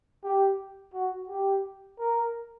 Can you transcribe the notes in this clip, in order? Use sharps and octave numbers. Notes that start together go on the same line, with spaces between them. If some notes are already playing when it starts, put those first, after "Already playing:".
G4
F#4
G4
A#4